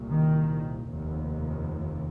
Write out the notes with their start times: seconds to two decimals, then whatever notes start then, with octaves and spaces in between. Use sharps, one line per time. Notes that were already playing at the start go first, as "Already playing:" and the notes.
Already playing: C2 A#2
0.09 D#3
0.87 F1 D#2